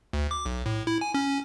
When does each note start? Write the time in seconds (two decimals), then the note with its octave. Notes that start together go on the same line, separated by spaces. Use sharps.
0.13 D2
0.31 D6
0.46 B1
0.66 A2
0.87 E4
1.01 G#5
1.14 C#4